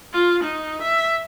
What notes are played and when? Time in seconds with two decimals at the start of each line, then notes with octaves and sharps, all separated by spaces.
0.13 F4
0.44 D#4
0.82 E5